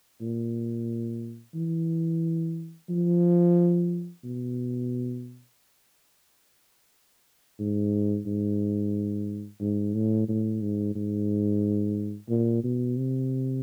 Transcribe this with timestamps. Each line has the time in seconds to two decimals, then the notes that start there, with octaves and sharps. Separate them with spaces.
0.21 A#2
1.54 E3
2.89 F3
4.24 B2
7.59 G#2
8.26 G#2
9.61 G#2
9.94 A2
10.28 A2
10.61 G#2
10.95 G#2
12.29 A#2
12.63 B2
12.97 C3